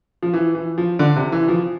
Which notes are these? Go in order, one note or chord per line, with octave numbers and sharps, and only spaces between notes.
F3
E3
E3
F3
D3
C3
E3
F3